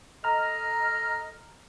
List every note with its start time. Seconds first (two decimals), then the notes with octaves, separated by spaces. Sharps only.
0.24 A4 D#5 A#5 F6